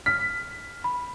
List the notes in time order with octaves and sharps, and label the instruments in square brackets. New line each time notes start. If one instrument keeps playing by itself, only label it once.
[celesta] F6 [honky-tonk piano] B6
[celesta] B5